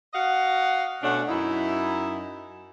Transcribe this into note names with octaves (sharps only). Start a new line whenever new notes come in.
F#4 D#5 F5 F#5
B2 A3 C#4 D4 F#5
F#2 D#4 E4